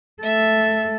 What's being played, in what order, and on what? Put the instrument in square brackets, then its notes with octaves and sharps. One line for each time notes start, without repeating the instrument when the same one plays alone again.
[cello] A3 A4 [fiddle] E5